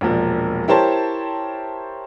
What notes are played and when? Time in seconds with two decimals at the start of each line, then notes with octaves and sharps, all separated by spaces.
0.01 E1 A#1 F3
0.68 E4 G4 A#4 C5 C#5 A5